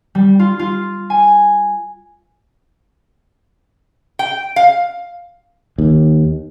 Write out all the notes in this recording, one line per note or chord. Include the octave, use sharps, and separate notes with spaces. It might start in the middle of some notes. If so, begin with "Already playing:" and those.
G3
F4
F4
G#5
G5
F5
D#2